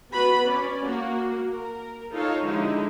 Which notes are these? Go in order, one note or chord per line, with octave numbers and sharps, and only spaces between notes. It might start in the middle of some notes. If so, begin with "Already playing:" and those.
B3 F#4 B4 B5
C#4 D5
A#3 F#4
A#4
D#4 F4 A4 C#5 F5
D3 F3 G#3 D#4 E4 G4